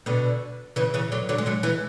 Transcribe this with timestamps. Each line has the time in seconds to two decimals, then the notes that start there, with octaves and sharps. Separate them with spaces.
0.06 B2 D3
0.76 C#3 E3
0.94 C#3 E3
1.12 D3 F#3
1.29 D3 F#3
1.38 G#3
1.46 D3 F#3
1.63 E3 G#3